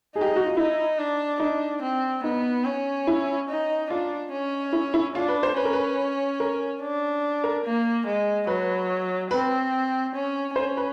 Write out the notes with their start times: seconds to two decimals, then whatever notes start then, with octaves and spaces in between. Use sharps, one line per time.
0.15 D#4 G#4
0.21 G4
0.26 G#4
0.36 F#4
0.46 F4
0.57 D#4 E4
0.98 D4
1.40 D4 D#4
1.82 C4
2.23 B3 D#4
2.64 C#4
3.07 E4
3.49 D#4
3.90 D4 F4
4.32 C#4
4.73 E4
4.94 E4
5.15 D4 F4
5.28 B4
5.43 C5
5.56 C#4 B4
5.65 A#4
5.73 B4
6.40 A#4
6.81 D4
7.44 A#4
7.65 A#3
8.06 G#3
8.47 F#3 B4
9.31 C4 B4
10.14 C#4
10.56 C#4 C5
10.77 B4